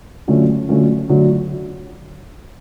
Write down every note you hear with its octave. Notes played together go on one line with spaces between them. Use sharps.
D3 F#3 A3 C#4 F4
D3 F#3 A3 C#4 F4
D3 F#3 A3